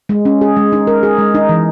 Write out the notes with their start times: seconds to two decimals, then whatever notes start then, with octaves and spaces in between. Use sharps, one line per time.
0.09 G#3
0.25 C#4
0.41 G#4
0.57 G#3
0.72 D#4
0.87 A#4
1.03 G#4
1.18 G#3
1.34 D#4
1.49 E3